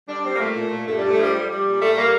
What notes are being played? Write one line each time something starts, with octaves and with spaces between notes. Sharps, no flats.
G3 D4
G3 C4
A#3
A#2 A3
A#2
A#2
G2 A3
G2 G3
A3
F3 G3
G3
G3
A#2
G3 A3
G3 A#3